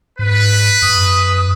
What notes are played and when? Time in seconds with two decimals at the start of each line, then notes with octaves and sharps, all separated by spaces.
0.19 G#2 B4
0.82 F#2 D#6